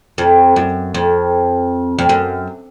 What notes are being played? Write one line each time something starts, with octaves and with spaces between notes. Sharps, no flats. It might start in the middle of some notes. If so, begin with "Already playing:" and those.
F2
F#2
F2
F2
F#2